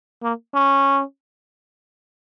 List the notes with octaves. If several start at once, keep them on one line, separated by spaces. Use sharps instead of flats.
A#3
C#4